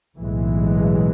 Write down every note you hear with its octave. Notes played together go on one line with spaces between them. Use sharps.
B1 A2 E3 G#3